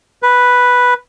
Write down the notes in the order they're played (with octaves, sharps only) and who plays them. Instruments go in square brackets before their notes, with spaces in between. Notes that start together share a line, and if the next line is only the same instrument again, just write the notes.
[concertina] B4